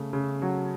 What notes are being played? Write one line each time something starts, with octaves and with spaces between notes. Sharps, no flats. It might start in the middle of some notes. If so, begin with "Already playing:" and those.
Already playing: C#3 A3
C#3
F#3